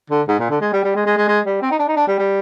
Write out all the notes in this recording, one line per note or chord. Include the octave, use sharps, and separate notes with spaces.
D3
G#2
A#2
D3
G#3
G3
G3
G#3
G#3
G#3
G#3
G3
C4
D#4
D4
D#4
D4
G3
G3